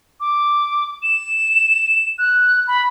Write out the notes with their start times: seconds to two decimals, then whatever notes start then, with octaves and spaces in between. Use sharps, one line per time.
0.20 D6
1.03 E7
2.18 F#6
2.67 B5